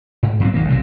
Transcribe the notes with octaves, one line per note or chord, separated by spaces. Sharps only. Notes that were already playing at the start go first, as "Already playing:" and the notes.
G#2
A#2 F#3 B3 C4
D#1 D#3 A#3
B1 C3 E3 F#3